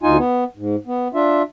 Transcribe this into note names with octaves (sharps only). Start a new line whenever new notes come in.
D2 D#4 F4 G#5
B3
G#2
B3
D4 F4 E5